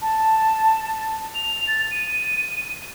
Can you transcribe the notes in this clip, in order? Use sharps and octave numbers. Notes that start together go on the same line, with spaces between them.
A5
F7
A6
D#7